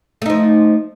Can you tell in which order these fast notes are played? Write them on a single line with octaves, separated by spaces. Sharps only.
A3 D#4 F3